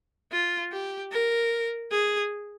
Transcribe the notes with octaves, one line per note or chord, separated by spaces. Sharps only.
F4
G4
A#4
G#4